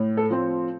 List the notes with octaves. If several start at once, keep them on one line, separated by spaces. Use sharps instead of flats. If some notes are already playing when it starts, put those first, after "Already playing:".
Already playing: A2
A4
F3 C4